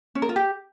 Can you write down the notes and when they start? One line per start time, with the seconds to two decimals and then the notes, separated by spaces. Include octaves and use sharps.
0.15 C#4
0.22 A#4
0.29 F4
0.36 G4